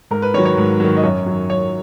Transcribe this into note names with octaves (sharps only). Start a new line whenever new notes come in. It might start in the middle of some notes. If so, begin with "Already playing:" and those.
G#2 A#4
B4
D#3 F#3 C#5
C#5
G#2
D#3 F#3
D#5
F#2 C#5
D#3 F#3
F#2 C#5